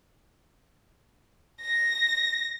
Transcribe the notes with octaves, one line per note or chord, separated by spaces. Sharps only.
A#6